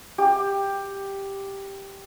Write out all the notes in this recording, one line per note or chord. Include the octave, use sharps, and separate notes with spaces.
G4